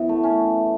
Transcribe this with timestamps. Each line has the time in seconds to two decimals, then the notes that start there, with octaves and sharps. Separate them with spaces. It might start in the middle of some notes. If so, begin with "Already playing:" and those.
Already playing: F#2 E3 B3 E4
0.09 A3
0.24 C#4